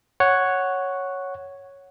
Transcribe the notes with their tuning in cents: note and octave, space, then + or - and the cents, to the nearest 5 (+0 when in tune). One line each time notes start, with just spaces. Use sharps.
C#5 +0 F#5 +0